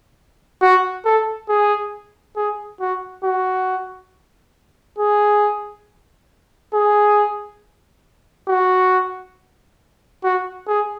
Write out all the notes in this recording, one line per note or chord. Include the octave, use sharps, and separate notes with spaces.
F#4
A4
G#4
G#4
F#4
F#4
G#4
G#4
F#4
F#4
G#4